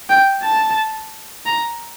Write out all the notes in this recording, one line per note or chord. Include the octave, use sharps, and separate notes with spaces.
G5
A5
A#5